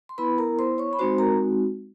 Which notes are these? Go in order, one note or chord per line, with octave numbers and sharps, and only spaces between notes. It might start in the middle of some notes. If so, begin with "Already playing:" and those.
C6
B3 E4 B4 B5
A#4 A#5
C5 C6
C#5 C#6
B5
G#3 C4 D#4 F#4 C5 C6
A#4 A#5